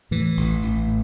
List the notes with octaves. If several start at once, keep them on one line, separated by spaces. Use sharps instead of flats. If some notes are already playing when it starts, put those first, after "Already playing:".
A2 E3
A1
A1
A2